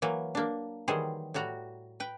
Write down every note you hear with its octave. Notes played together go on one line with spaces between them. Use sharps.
E3 F#3 A#3
A#3 D4
D#3 E3 F#3 G3 G#4 C5
A2 G3 F#4 A#5
B4 G5